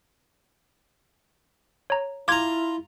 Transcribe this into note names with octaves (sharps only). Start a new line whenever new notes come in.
C#5 A#5
E4 F4 A#5 D6 G#6